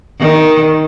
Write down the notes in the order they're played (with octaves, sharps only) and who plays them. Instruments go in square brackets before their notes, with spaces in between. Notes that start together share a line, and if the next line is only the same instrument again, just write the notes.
[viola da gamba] D#3